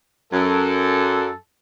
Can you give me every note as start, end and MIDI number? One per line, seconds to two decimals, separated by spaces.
0.33 1.32 42
0.33 1.37 69